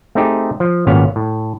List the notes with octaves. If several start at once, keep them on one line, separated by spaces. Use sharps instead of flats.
A3 C4 D#4 G4 G#4
F3
G#1 A#2 B3 C#4 F5
A2